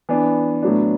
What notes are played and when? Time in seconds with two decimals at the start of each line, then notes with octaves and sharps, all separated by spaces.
0.09 E3 B3 D4
0.62 A2 F#3 B3 D4